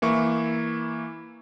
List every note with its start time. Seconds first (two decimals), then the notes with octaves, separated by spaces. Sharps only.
0.02 E3 A#3 E4 C#6